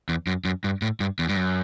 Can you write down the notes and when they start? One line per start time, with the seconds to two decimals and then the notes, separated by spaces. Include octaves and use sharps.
0.09 E2
0.27 F#2
0.45 F#2
0.64 G2
0.82 A2
1.00 G2
1.19 E2
1.29 G2
1.36 F#2